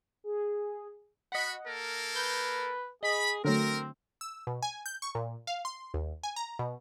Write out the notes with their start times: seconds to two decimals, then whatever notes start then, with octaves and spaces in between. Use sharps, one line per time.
0.24 G#4
1.32 F#4 D#5 F#5 B5
1.66 A#3 A4 A#4
2.16 B4 G6
3.03 G#4 D#5 B5
3.45 D3 F#3 A3 C4 A#4
4.21 E6
4.47 B2
4.62 G#5
4.86 G6
5.02 C#6
5.15 A#2
5.47 F5
5.65 C6
5.94 D#2
6.23 G#5
6.36 A#5
6.59 B2